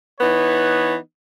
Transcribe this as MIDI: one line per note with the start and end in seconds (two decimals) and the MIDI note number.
0.21 0.96 52
0.21 0.96 59
0.21 0.96 63
0.21 0.96 71
0.21 0.96 73